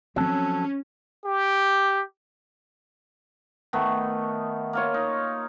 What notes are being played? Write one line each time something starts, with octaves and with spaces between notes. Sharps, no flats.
F3 F#3 C4 C#4 A4
G4
D#3 A3 B3
A#3 F4 C#5
D#4